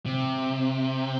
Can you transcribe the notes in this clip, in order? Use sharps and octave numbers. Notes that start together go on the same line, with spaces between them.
C3